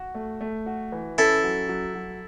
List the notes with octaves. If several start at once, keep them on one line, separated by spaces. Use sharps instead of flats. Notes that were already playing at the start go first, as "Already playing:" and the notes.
Already playing: F#4
A3
A3
F#4
E3
C#4 E4 A4
F#3
F#3
F#3